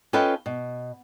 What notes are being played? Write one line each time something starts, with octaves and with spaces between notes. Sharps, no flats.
C#4 F4 A4 B4 D#5 G5
B2